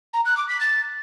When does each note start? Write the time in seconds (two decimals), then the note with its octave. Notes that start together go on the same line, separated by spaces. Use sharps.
0.13 A#5
0.25 F#6
0.37 D6
0.48 B6
0.60 A6